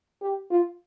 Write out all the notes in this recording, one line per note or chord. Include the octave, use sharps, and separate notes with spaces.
G4
F4